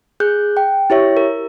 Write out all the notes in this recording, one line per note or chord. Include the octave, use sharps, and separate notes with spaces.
G#4 F#6 G6
G5
E4 G4 C#5 E5
A#4